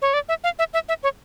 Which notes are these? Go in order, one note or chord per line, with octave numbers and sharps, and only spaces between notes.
C#5
D5
E5
F5
E5
E5
E5
C#5